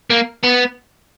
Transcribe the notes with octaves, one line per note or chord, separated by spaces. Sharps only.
A#3
B3